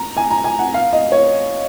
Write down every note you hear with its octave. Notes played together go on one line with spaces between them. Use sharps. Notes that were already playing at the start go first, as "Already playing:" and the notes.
Already playing: A#5
G#5
A#5
G#5
F#5
F5
D#5
C#5